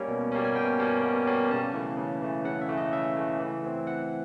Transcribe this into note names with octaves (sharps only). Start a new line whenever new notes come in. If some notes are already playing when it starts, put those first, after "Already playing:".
Already playing: G3 A#3 C#4 C#5
B2
G3 A#3 C#4
G#5
B2 G5
G3 A#3 C#4
B2
G3 A#3 C#4
C#3 A5
E3 A3
C#3
E3 A3
C#3 F#5
E5
E3 A3
D#5
C#3 E5
E3 A3
E3
A3 C4
E3 F#5